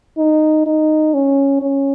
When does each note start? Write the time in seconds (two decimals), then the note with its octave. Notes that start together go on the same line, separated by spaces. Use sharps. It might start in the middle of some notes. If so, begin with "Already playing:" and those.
0.18 D#4
0.66 D#4
1.14 C#4
1.62 C#4